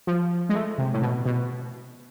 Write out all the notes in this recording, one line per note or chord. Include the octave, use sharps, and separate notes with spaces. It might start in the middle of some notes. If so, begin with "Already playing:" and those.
F3
G#3
A3
C3
A2
B2
B2